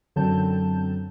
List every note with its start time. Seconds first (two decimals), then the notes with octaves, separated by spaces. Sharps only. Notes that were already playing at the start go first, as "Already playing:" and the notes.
0.16 F#2 D3 F#3 C4 A5 G6